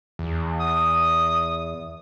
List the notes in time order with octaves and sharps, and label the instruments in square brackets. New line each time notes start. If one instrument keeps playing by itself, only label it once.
[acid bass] E2
[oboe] D#6